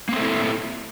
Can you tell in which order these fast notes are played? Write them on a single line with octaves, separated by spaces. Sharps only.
A#3 C4 A3 E4